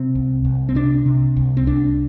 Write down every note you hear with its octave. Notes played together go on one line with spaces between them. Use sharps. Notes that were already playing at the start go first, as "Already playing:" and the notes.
Already playing: C3 C4
C2
C2
C4
C3 D4
C3
C2
C4
C2 D4